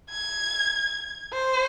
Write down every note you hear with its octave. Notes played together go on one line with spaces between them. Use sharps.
G#6
C5